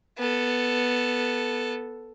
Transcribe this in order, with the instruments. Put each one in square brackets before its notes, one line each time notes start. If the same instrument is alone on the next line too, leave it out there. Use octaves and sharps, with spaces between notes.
[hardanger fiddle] B3 A4